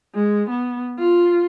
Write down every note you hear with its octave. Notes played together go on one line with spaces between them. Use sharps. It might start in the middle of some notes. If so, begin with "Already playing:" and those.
G#3
B3
F4